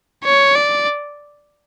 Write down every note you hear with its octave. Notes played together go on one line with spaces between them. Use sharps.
C#5
D5